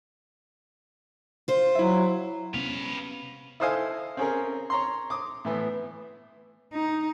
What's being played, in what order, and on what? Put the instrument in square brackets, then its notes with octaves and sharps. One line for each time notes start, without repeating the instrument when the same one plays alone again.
[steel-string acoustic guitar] F4 C5
[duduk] F#3 [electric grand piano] E4 E5
[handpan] C3 B3 C#4 [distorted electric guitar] B4 F5
[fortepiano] E4 A4 C5 D#5 F5 G#5
C4 C#4 G#4 A#4
C#5 A#5 C6
D6 D#6
A2 E3 B3
[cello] D#4